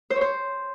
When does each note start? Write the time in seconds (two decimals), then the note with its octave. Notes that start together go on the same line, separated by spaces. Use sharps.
0.10 C5
0.16 C#5
0.21 C5